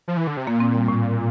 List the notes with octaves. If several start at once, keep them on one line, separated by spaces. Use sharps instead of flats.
F3
E3
D3
C3
A#2 A#3
C4
G3
A2